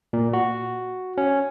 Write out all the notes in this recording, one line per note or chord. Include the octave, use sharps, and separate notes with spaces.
A#2
F#4
C#4